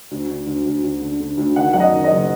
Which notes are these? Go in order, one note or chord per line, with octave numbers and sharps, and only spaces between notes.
D2
D3
D2
D2
D2
D3
D3
D2
D#3 F#5
F#2 F#5
D#5
D#3
D#5
F#1